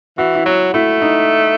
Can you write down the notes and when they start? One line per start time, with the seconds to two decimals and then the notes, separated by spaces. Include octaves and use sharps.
0.18 E3 F#4
0.35 E4
0.46 F#3 F#4
0.74 A3 E4
1.02 D#4